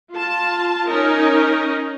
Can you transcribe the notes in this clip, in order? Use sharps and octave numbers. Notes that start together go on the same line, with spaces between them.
F4 A5
C#4 D#4 A#4